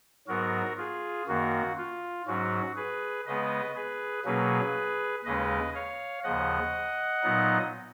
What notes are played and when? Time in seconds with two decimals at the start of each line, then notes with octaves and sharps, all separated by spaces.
0.28 G#2 F#3 B3 F#4 A#4
0.77 F4 G#4
1.27 F#2 D#3 A#3 F#4
1.77 F4
2.26 G#2 F#3 C#4 F#4
2.76 G#4 B4
3.26 C#3 G#3 B3 B4 D#5
3.75 G#4 B4
4.25 B2 F#3 A#3 C#4 G#4 B4
5.24 D#2 C#3 G#3 C#4 B4 D#5
5.74 C#5 F5
6.24 D#2 C#3 F3 D#5 F#5
7.23 A#2 F#3 B3 D#4